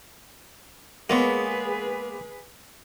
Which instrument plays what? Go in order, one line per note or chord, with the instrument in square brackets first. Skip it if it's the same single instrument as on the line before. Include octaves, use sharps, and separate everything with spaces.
[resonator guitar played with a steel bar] G#3 B3 C#5 [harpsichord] A#3 [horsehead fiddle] G#4 B4